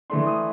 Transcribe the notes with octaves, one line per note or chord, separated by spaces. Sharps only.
E3 A3 D4 C6
D#6